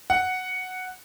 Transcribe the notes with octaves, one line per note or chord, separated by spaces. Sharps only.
F#5